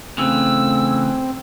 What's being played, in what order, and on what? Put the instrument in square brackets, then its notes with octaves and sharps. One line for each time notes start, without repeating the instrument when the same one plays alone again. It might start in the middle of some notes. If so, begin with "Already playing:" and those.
[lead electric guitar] C#3 E3 [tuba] A3 [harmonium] C4 [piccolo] E6